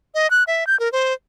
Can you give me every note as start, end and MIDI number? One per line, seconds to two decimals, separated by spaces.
0.15 0.30 75
0.31 0.44 90
0.47 0.67 76
0.67 0.78 91
0.80 0.91 70
0.92 1.13 72